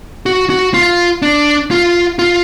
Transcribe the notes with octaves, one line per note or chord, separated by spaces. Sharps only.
F#4
F#4
F4
D4
F4
F4